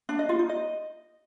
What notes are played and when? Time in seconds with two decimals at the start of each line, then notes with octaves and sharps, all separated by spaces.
0.09 D4
0.19 D#5
0.29 F4
0.39 D#4
0.49 D#5